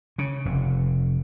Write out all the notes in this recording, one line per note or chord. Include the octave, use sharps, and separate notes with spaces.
C#3
F1